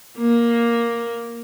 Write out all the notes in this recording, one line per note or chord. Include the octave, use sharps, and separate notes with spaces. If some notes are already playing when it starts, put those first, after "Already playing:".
A#3